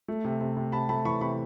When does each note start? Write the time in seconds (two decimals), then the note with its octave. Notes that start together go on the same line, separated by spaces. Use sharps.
0.08 A3
0.25 C3
0.41 C3
0.57 C3
0.72 C3 A5 B5
0.89 A3 A5 B5
1.05 E3 B5 C#6
1.21 C3 B5 C#6